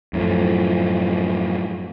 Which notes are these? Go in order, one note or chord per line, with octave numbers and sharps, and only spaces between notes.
F#2 A2 F3